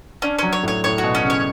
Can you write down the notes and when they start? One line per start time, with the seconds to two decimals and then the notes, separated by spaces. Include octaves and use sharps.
0.22 C#4 D4
0.39 F#3 C#4
0.53 C#5
0.63 A2 C#5
0.84 A2 C#5
0.98 F#4
1.04 B2
1.15 C#4
1.24 C#3
1.30 C#5